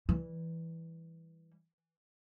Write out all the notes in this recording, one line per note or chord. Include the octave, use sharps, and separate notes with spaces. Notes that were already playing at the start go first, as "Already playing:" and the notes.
E3 G3